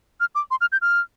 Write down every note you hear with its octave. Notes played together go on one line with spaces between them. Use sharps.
F6
D6
C6
F6
G6
F6